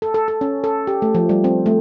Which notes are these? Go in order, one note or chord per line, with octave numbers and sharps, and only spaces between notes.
A4
A4
A4
C#4
A4
G4
A3
F3
G3
C4
A3